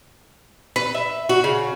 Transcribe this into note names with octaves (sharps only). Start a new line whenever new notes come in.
B4
E5
F#4
C#3